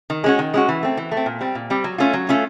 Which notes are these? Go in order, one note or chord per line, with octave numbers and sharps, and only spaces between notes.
D#3
G#3 C#4 F#4
D#3
G#3 C#4 F#4
E3
A3 C4
E3
A3
C4
A#2
G3 C4
A#2
G3 C4
F#3
A3 C#4 F4
F#3
A3 C#4 F4